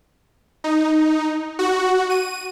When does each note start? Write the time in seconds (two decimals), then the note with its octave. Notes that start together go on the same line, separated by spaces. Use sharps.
0.64 D#4
1.59 F#4
2.10 D#7